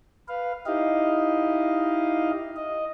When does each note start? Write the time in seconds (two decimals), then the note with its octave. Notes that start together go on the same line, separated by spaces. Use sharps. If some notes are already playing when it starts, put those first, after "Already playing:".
0.28 B4 F5
0.66 D#4 E4 G4 D#5 F5
2.56 D#5